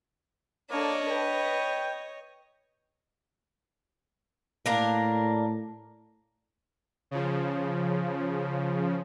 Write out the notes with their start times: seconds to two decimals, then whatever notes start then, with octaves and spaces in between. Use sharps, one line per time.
0.71 A#3 D4 A4 C#5 D#5
1.10 B4 G5
4.66 A2 A#3 D4 A#4
7.11 C#3 F3